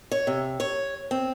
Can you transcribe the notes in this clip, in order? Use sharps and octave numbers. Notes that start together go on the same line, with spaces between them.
C#5
C3
C#5
C4